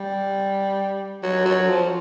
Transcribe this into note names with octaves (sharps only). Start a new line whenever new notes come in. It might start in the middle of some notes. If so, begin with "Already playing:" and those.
Already playing: G3
F#3
F#3
F3